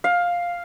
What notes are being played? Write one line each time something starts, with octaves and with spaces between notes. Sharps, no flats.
F5